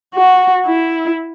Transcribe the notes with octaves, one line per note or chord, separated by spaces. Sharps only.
F#4
E4